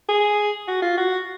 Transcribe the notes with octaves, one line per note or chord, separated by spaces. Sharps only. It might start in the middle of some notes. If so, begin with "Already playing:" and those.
G#4
F#4
F4
F#4